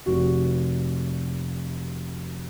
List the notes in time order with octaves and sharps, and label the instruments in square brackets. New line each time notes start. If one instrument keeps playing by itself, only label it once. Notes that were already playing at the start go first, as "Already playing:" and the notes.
[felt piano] F1 F#4